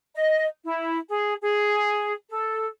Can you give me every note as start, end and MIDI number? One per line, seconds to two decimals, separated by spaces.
0.15 0.46 75
0.64 0.98 64
1.09 1.34 68
1.41 2.12 68
2.29 2.66 69